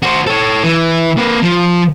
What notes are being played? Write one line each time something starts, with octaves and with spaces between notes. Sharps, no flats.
F#4 C5
A4 C#5
E3
A#3 B4
F3